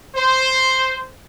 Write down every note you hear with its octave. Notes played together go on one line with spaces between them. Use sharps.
C5